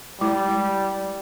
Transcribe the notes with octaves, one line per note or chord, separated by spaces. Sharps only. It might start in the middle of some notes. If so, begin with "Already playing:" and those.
G3 G#3 E4